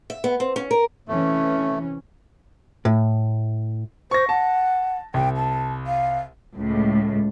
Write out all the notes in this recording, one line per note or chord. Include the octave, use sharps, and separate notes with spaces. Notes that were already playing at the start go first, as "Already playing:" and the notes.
E5
B3
C4
C#4
A#4
C3 E3 A3 C#4
A2
C5 C#6 A#6
F#5 A5
C2 G5
A5
F5
C#2 A2